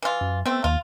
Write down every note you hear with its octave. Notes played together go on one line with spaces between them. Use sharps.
E3 F4
F#2
A3 B3 C4
D#2 F4